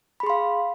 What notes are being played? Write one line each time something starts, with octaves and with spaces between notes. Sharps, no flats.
G#4 F5 B5 C6